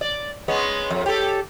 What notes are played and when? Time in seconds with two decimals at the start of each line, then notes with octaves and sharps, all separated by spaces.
0.01 D5
0.48 G#3 B3 C#4
0.91 F2
1.06 G4 A4